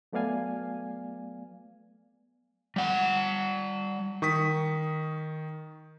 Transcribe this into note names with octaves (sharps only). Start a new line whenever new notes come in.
F#3 A3 B3 D5 F5 G#5
G3 F#5
D#3 C#6 D#6 B6